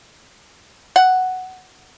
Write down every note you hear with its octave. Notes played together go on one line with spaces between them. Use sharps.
F#5